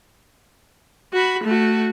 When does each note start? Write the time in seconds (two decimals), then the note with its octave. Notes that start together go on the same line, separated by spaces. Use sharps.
1.13 F#4 B5
1.44 A3 F#4